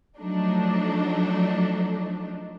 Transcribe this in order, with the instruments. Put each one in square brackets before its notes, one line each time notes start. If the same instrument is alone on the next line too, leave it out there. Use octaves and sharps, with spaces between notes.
[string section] F3 F#3 A3 D4 D#4